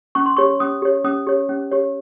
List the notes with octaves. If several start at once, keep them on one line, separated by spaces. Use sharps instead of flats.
C#4 C#6
C6
G4 C#5 C#6
C#4 D#6
G4 C#5
C#4 D#6
G4 C#5
C#4
G4 C#5